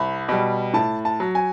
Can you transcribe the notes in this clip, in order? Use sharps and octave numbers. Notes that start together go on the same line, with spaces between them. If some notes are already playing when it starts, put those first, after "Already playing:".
Already playing: C2 B5
B2 G3
A2 A5
A5
F#3
G#5